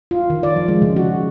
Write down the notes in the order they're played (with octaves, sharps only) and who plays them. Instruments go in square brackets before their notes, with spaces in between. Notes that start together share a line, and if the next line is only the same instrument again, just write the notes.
[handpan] F4
D#3
D5
F3
G#3
C#3
F#4